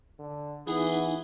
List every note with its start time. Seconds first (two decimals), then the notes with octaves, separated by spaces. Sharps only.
0.19 D3
0.67 E3 B3 D#4 E4 G#4